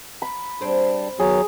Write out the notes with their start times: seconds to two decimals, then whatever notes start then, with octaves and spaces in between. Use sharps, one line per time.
0.22 B5
0.61 G3 C4 D4 G#4 C5
1.19 D#3 F#3 B3 G#4